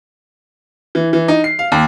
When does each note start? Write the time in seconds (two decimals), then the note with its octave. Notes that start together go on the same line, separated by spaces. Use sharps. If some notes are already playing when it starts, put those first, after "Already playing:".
0.95 E3
1.13 E3
1.28 D#4
1.44 C7
1.59 F5
1.72 D#2